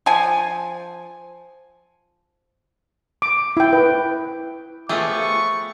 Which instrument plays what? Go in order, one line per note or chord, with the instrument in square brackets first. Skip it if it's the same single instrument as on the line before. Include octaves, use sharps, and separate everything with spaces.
[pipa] F3 G#5
[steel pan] D6
E4 G5
B4
[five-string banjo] F3 B3 G4 [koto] A3 G#4 F5 [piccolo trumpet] C#6